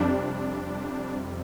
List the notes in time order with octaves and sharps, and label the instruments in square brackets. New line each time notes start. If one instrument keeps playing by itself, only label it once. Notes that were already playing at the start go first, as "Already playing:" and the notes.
Already playing: [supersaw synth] F2 C3 G3 D4